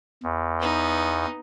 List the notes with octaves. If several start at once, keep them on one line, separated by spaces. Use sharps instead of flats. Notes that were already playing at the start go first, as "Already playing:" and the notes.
E2
B3 D#4